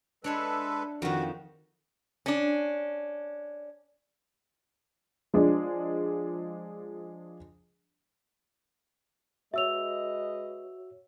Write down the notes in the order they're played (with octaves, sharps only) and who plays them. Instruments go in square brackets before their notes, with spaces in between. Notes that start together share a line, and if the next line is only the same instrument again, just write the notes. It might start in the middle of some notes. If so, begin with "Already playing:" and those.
[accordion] G#3 A4 B4 [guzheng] D4 C#5 E5
[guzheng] F2 D#3 [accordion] F#4
[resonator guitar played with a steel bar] C#4 D4
[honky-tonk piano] F3 G#3 D4
[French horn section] G#3 B4 D#5 [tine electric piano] F#4 C#5 [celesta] E5 E6 F7